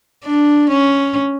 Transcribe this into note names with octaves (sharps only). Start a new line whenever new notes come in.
D4
C#4